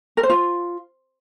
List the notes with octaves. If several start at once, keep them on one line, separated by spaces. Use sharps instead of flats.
A#4
C5
F4